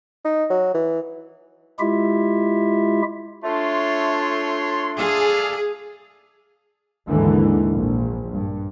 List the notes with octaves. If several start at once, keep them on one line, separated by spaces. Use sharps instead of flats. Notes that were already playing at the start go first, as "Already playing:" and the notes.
D#4
F#3
E3
G#3 E4 F4 G4 E5
A3 D4 F4 C#5 C6
G#4 A4 D5 F5
D#2 G#2 D3 E3
A#1
G2